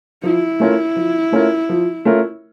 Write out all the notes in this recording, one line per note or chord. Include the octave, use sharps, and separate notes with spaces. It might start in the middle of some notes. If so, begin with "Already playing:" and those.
F3 E4
A3 C#4 F4 A#4
F3
A3 C#4 F4 A#4
F3
A3 C#4 F4 A#4